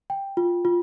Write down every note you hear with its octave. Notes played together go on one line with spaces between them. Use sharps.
G5
F4
F4